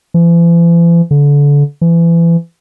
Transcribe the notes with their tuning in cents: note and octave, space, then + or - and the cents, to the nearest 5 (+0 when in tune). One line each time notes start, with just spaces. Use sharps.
E3 +45
D3 -30
E3 +30